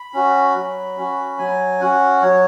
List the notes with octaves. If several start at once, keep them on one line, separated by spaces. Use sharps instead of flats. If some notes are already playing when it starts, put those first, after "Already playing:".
Already playing: B5
C#4 F#4
F#3
C#4 F#4
F#3 G#5
C#4 F#4 F#5
F#3 C#5